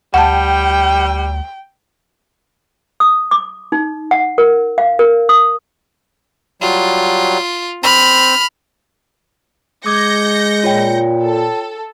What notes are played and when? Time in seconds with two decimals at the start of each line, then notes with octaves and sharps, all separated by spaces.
0.14 D2 G3 F#5 G5 A5
3.00 D#6
3.31 D6
3.72 D#4
4.11 F#5
4.38 A#4
4.78 F5
4.99 A#4
5.29 D#6
6.61 F#3 G3 F4
7.83 C4 B5 F6
9.86 G#3 D6 D#6 G6 G#6 A#6 C#7
10.64 A#2 F4 C#5 G5
11.23 A4